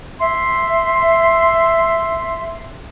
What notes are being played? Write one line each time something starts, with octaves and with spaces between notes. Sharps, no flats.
E5 C6